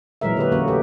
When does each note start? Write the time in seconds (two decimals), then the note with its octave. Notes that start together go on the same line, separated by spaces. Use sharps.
0.21 A#2 E3 F#3 G#3 A#4 E5
0.37 D3 G4 B4
0.52 D3 A#3 C#4 F#4
0.68 A3 G4